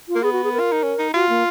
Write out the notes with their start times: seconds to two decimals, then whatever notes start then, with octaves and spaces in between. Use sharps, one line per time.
0.09 F4
0.15 A#3
0.23 B3 G#4
0.33 F#4
0.44 G#4
0.53 A#4
0.60 F4
0.72 D#4
0.83 C#4
0.99 D#4
1.14 F4 F#4
1.29 A#3